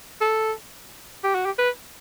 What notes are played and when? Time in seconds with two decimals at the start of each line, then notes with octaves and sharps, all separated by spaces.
0.21 A4
1.24 G4
1.35 F#4
1.45 G4
1.59 B4